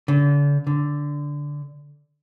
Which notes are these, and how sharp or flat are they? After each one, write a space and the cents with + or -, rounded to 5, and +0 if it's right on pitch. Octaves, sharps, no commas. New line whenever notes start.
D3 -40
D3 -10